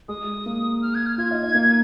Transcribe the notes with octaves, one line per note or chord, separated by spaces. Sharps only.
G#3 D#6
A#3
F6
G#6
F6
F4 G#6
D#4
D#4
A#3